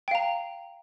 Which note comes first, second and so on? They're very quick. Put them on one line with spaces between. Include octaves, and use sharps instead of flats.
G5 F5 A#5